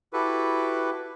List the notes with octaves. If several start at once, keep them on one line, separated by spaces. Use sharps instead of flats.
E4 F#4 G4 A4 B4